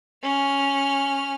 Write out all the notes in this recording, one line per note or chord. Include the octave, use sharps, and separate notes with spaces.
C#4 F6